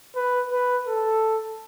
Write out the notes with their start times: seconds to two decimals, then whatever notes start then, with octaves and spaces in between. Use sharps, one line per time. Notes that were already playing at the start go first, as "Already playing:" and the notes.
0.16 B4
0.52 B4
0.88 A4